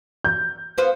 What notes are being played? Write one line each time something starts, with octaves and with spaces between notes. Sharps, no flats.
G6
B3 F4 C5